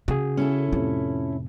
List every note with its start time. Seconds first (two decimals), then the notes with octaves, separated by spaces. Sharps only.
0.08 C#3 F#4 G#4
0.37 C#4 E4 A4
0.73 F2 A2 C3 F4